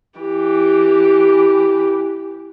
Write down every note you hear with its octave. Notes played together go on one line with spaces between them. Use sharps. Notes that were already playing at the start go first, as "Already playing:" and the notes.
E3 G4